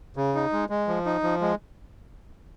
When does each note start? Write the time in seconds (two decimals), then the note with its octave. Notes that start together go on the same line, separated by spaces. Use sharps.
0.17 C#3
0.35 D#4
0.52 G#3
0.70 G#3
0.88 F3
1.06 D#4
1.23 F3
1.41 G#3